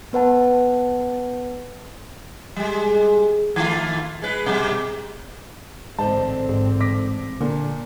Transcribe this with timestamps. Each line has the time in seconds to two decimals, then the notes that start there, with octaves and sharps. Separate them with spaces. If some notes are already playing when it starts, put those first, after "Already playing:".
0.13 B3 B4 F#5 A5
2.56 G3 G#3
3.56 D#3 A3 F4
4.22 G#3 B4
4.46 B2 G3
5.99 A1 G#2 D3 C4 C5 D#5 A5
6.49 G#2
6.80 D6 A#6 B6
7.41 A#2 D3 D4 A#4